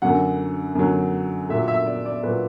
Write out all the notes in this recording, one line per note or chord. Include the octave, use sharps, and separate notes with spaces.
F#2 D3 F#3 F#5
F#2 D3 F#3
A#2 F#3 E5
E5
D5
D5
A#2 F#3 B4